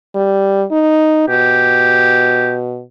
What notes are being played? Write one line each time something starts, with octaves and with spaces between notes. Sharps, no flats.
G3
D#4
B2 G4